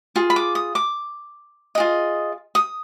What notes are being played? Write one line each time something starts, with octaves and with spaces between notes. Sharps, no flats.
F4 G#4
B5
D6
D#6
D6
F4 G#4 D#5
D#6